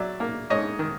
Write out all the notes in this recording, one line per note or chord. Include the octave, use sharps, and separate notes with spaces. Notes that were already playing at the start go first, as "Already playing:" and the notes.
Already playing: F#3 D5 E5
A#3
G#2 C#5 D#5
D#3